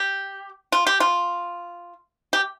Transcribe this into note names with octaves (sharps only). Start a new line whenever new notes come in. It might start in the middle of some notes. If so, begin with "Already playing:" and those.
Already playing: G4
F4
G4
F4
G4